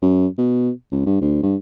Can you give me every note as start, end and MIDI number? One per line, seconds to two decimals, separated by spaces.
0.02 0.27 42
0.38 0.70 47
0.92 1.05 37
1.06 1.21 43
1.21 1.40 38
1.43 1.56 43